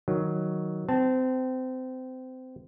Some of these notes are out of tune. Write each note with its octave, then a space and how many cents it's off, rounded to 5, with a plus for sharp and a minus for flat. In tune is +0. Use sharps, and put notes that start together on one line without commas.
D#3 +0 F#3 +0
C4 -25 A5 -15